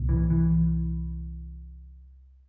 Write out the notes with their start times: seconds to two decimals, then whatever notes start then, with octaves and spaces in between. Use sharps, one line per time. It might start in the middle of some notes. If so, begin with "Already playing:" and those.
Already playing: C2 A#2
0.09 E3
0.30 E3